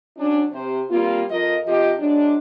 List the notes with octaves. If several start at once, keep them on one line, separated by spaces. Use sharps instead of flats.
F#3 C#4 D4
C3 C5
G3 A#3 C4 F4
F2 F3 A#4 D#5
C3 F3 G4 D#5
F#3 G#3 D4